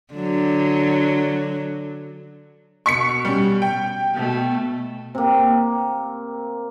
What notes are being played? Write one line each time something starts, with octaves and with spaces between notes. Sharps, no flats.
D3 F#3
B2 C#6 B6 C#7
G3 C#4
G5
B2 A3
C3 A#3